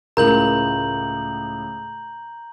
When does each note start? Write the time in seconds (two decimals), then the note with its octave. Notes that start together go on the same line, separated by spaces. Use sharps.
0.17 C#2 A2 A#4 A#5 G6 F#7